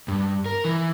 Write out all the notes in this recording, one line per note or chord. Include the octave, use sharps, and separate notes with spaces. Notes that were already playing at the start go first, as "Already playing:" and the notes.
G2
A#4
E3